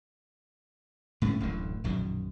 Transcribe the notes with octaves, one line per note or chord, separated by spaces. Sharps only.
A2 G#3 A3 C#4
D1 A1 F#2 D3
A#1 F#2 B2 D#3